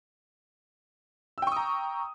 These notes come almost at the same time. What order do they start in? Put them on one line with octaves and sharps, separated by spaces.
E6 G5 C#6 D#6 A#5